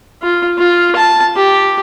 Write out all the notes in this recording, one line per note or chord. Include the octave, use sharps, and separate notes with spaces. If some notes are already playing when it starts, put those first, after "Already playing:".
F4
F4
A5
G4